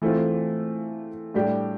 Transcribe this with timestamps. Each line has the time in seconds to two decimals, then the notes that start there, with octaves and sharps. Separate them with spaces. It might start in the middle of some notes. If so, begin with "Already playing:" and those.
0.02 E3 A3 C4 F4
1.34 A2 G3 D4 G4